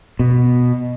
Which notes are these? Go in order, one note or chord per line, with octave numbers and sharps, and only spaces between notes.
B2